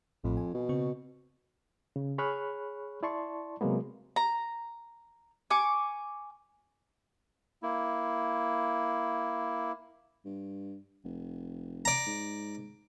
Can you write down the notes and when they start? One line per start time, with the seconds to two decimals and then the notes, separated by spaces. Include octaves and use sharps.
0.24 A1 F2 A2 B5
0.37 G#5
0.54 B2
0.69 C#3 C4 C#6
1.96 C#3
2.18 G#4 C#5 B5 C#6 F6 F#6
3.03 E4 D5 A5 C6 C#6
3.61 C3 F#3 G#3 A#3 B3
4.16 A#5
5.50 G#5 C#6 D6
7.63 A#3 E4
10.25 G2
11.04 F1
11.85 D5 A#5
12.06 G#2